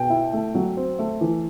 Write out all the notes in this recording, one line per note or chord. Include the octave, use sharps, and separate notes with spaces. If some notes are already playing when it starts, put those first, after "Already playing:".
Already playing: B2 G5
E4
A3
F#3
C4
A3
E3